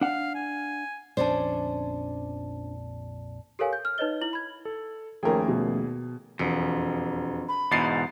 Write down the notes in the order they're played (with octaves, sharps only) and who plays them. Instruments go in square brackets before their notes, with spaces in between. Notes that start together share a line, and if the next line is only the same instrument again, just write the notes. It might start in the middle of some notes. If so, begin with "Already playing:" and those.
[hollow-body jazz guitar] D4 F#5 [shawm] F5
[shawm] G#5
[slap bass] A#1 F2 D3 [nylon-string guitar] C#4 D4 C5 [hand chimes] D5 A5
[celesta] G4 A4 A#4 C#5 F5 G#5
G6
F6
D#4 B4 C#5 D#5 G7
E4 F#7
B5 G#6
[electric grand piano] A4
[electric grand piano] D#2 A#3 G#4 [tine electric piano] F3 A3 C#4 [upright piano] A#4 G5
[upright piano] B2
[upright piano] E1 [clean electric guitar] F2
[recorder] B5
[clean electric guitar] E2 G#2 B2 [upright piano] A6 C7